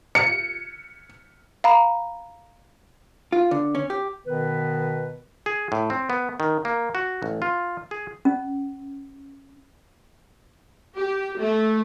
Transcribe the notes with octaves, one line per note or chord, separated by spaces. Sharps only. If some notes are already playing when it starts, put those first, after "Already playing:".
C#7
F5 A#5 B5
F4
D3
C#4
G4
B2 D#3 B3 B4
G#4
A2
C4
B3
D#3
A#3
F#4
A1
F4
G#4
C#4
G4
A3